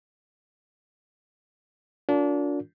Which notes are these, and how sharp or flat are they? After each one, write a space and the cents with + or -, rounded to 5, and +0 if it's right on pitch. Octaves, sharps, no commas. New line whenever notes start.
D4 -30 F4 +35 A#4 -35